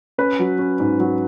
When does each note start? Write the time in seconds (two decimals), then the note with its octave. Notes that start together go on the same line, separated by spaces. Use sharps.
0.18 C#4 B4
0.39 F#3
0.59 C#4
0.80 G#2
0.99 F#3